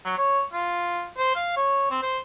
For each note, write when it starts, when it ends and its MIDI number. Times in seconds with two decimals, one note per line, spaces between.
0.05 0.17 54
0.18 0.42 73
0.53 1.07 65
1.18 1.35 72
1.35 1.56 77
1.56 1.89 73
1.91 2.00 60
2.02 2.19 72